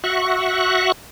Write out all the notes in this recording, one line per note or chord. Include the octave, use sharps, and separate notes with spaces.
F#4 E5 C#6 F#6